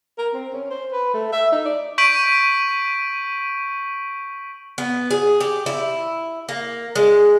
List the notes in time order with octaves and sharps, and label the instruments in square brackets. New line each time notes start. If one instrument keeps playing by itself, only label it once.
[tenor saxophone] A#4
C4
C#4
C5
B4
A3
E5
D#4
D5
[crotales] C#6 G6 B6 D7 D#7 F#7
[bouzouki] B3
G#4
G4
E4
A#3
G#3